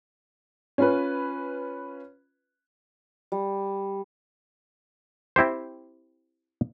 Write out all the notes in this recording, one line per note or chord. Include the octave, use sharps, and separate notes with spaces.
C#4 F4 B4
G3
C4 E4 G4 C5